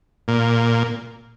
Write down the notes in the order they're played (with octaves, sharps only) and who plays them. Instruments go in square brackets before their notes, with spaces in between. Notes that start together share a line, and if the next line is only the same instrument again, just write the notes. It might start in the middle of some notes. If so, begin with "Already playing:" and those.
[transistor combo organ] A#2